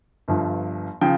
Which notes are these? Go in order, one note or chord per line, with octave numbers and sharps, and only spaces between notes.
G1 G2 F3
C#3 F3 G5